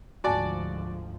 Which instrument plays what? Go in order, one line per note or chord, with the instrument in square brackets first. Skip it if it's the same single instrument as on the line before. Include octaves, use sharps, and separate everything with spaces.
[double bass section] D2 G#2 F3 [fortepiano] F#4 D5 [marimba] G#5 A5 A6